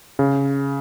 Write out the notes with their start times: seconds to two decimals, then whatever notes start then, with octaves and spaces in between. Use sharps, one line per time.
0.19 C#3